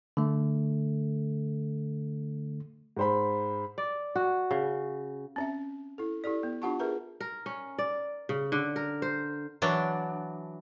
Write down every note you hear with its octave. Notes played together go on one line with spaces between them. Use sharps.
D3 A3
G#2 C5 B5
D5
F#4
C#3
C4 C#4 E5
E4 A4
E4 G4 A4 D5
B3
D4 F4 G4 F#5 A5 C#6
G#4 A#4 B4 E5 A#5
A#4
C#4
D5
C#3
D3
A#4
C5
E3 F#3 D4